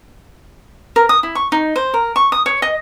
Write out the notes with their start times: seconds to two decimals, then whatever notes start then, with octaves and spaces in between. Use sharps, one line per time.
0.96 A#4
1.09 D#6
1.23 E4
1.35 C#6
1.52 D#4
1.76 C5
1.94 A#4
2.16 C#6
2.32 D#6
2.46 C#5
2.62 D#5